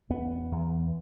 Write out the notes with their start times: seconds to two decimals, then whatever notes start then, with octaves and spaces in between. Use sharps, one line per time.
0.10 E2 B3
0.52 E2